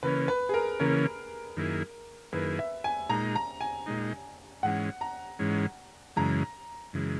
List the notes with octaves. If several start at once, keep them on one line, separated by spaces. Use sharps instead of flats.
C#3 E3 A#3 C#4 B4
B4
G#4
A#4
C#3 E3 A#3 C#4 A#4
F#2 D#3 A#3 E4 G#4
F#2 D#3 A#3 E4 G#4 B4
E5
G#5
A#2 G#3 D#4 A#5
A#5
G#5
A#2 G#3 D#4
G#2 E3 G#3 C#4 F#5
A#5
G#2 E3 G#3 C#4
F#2 C#3 E3 G#3 A#5
F#2 C#3 E3 G#3